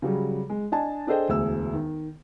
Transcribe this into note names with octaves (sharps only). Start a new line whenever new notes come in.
C#3 F#3 G3
G#3
D4 D#5 G#5 A5
D4 G#4 A4 C5 D#5 G5
E1 D2 G#4 E6
D#3